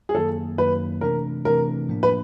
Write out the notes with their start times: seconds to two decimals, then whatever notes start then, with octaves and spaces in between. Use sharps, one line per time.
0.09 G#4
0.15 F#2 D#3 F#3 A#3 A4
0.58 F#2 D#3 F#3 A#3 B4
1.01 C3 E3 A3 D4 A#4
1.45 C3 E3 A3 D4 A#4
1.89 A2 F3 A#3 D4
2.03 B4